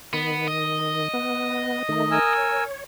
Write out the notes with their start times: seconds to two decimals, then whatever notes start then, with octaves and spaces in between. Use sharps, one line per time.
0.13 D#3 B3
0.48 D#5
1.13 B3
1.89 D#3 A3 D#4
2.11 A#4 G#5 E6
2.35 C#5